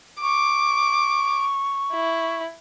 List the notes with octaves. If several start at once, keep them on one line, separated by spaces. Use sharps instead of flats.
C#6 D6
E4